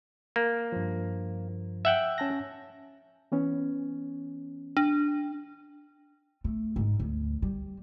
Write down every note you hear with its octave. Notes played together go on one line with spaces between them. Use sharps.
A#3
G2 F3
E5 F#5 G5
C#4 A5 A#6
E3 B3 C#4
D4
A3
G#2
D2
G3